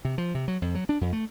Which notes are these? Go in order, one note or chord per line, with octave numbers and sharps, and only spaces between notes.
C3
F3
C3
F#3
F2
F#3
D4
F2
A3